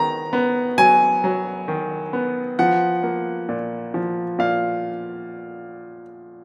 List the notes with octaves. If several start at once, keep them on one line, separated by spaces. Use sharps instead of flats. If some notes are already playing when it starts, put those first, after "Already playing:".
Already playing: D#3 B3 A#5
B3
F#3 G#5
F#3
D#3
B3
F3 F#5
A#3
A#2
F3
A#2 F5